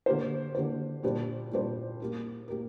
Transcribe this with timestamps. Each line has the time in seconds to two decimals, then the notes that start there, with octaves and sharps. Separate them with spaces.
0.06 D3 A#3 G4 C5
0.55 D3 A#3 G4 C5
1.03 A#2 G3 D4 G4 C5
1.51 A#2 G3 D4 G4 C5
2.00 A#3 G4 A#4
2.48 A#3 G4 A#4